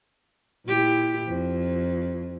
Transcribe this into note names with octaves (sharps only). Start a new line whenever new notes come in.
A#2 E4 G4
F2